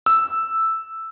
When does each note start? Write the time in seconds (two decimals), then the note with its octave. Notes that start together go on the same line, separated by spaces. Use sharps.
0.06 E6